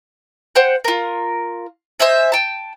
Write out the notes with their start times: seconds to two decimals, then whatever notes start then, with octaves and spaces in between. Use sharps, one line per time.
0.55 C5 F#5 G5
0.84 F4 A#4
2.00 C5 D#5 E5 G#5
2.32 G5 A5